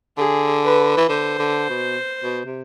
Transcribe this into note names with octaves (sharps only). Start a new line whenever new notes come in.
D3 G#4
B4
E3
D3 C5
D3
B2
B2
C3